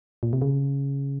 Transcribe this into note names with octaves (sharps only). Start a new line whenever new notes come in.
A#2
C3
C#3